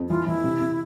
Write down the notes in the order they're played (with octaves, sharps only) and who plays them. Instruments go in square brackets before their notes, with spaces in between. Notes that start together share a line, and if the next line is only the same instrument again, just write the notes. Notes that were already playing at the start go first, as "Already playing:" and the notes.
Already playing: [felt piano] F2
[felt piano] E3 [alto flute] F4
[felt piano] E3 [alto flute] E4
[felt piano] C3
C3